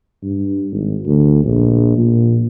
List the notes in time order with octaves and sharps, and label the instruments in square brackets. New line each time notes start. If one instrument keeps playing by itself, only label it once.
[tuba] G2
G#1
D2
A#1
A#2